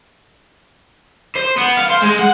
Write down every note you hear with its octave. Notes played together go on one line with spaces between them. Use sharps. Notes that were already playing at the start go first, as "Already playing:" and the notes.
C5
B3
F5
C5
G#3
F#5